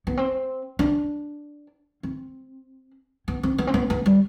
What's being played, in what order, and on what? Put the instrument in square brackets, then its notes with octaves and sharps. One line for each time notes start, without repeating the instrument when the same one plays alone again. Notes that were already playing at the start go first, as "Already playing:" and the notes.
[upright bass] B3
C4
D4
C4
B3
C4
B3
C4
B3
B3
G3